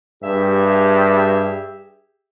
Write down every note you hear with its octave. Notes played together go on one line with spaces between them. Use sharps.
G2 G4 G#4 E5